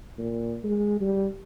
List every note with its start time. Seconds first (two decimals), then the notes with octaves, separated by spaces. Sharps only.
0.18 A#2
0.63 G#3
1.01 G3